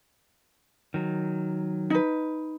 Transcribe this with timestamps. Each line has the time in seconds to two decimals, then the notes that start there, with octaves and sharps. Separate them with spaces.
0.94 D#3 F#3
1.90 D#4 B4